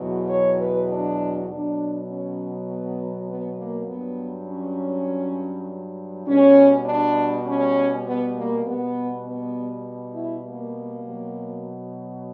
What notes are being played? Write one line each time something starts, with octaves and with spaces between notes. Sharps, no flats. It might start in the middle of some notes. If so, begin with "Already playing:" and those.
Already playing: E2 B2 F#3
C#5
B4
D4
B2 F#3 D4
C#4
B3
B3
A#3
G2 F#3 B3
C#4
B2 G3 C#4
D4
C#4
B3
A#3
B2 G3 B3
B3
E4
A#3
B2 F#3